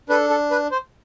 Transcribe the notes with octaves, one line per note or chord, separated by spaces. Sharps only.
D4 A4 B4
A4
B4
C5